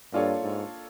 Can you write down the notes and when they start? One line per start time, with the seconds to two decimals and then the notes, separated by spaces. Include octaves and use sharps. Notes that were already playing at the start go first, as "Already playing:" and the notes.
0.12 G2 A#3 D4 F4 A4 C#5
0.42 G#2